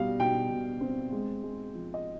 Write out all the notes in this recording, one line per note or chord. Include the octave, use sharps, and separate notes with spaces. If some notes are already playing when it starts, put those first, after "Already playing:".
Already playing: B2 G3 F5
B2 G5
B2
C4
G#3
G#3
F3
D#5